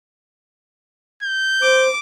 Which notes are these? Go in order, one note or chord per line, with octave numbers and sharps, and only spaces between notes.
G6
C5 D6